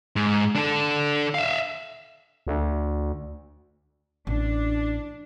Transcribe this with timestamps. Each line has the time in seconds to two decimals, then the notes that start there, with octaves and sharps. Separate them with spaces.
0.16 G#2
0.55 D4 A4
1.34 E5 F5
2.47 D2
4.27 A1 D4